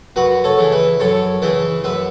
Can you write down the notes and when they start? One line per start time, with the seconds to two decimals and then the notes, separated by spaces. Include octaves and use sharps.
0.16 F#2 F#4 B4
0.44 A4 C#5
0.58 C#3 E3
0.72 B4 E5
1.00 F#2 A4 C#5
1.42 C#3 E3 B4 E5
1.84 F#2 B4 E5